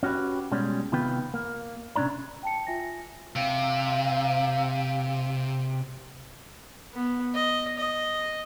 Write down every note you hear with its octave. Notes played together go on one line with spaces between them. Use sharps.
C#4 F#4 G4 B4
B2 G3 G#3 C#4
C3 D#3 B3 F4 B4 G5
A#3
C3 C#4 D4 D5 A#5
G5 A5 C#7
F4 E5 G#5 A#6
C3 F5
B3
D#5
D#5